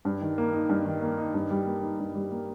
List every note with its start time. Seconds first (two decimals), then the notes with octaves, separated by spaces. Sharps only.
0.05 G2
0.21 D#3
0.38 A#3
0.53 D#4
0.69 G2
0.85 D#3
1.02 A#3
1.18 D#4
1.34 G2
1.51 G3
1.66 A#3
1.82 D#4
1.99 G2
2.15 G3
2.31 A#3